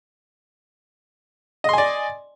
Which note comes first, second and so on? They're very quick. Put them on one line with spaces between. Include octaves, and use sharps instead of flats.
D#5 C6 G#5 D5